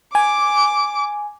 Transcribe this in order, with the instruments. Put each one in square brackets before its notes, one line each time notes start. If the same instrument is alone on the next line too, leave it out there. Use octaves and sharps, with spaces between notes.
[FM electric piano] G#5 [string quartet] D6